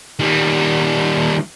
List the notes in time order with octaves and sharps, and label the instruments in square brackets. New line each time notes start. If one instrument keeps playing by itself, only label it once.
[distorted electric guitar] D#3 G3